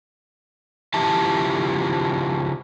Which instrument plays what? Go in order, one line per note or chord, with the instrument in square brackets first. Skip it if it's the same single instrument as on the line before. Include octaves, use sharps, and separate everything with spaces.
[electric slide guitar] C#3 F3 E4 G4 E5 A5